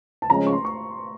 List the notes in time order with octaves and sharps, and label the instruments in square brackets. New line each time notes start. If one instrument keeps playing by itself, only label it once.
[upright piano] A5
[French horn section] C#3 F3 G#3 C#4 [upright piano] A#5
[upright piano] C#6
C6
C#6